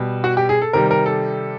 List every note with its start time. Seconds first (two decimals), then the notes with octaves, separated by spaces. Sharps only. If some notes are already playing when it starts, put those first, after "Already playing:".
Already playing: B2 G3
0.24 F#4
0.37 G4
0.49 G#4
0.62 A4
0.73 C3 D#3 G3 A#4
0.91 A#4
1.06 A4